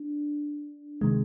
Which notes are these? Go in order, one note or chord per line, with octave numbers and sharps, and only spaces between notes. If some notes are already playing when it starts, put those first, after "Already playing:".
Already playing: D4
C3 D#3 G#3